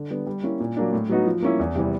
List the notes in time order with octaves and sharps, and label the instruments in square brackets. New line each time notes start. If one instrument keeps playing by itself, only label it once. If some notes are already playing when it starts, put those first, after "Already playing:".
Already playing: [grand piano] D3
G3 B3 D4
G3
A#3 C#4 E4
A#2
F#3 A#3 D4
A2
F#3 B3 D#4 F#4
F3
A#3 C#4 E4
E2
C3 E3 G3 C4